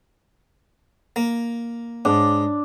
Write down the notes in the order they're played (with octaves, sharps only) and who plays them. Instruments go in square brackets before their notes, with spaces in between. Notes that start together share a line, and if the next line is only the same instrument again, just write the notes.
[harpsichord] A#3
[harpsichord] G#2 [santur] D4